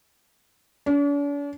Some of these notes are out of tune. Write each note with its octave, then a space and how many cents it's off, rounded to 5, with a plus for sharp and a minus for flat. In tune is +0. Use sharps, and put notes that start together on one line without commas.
D4 -45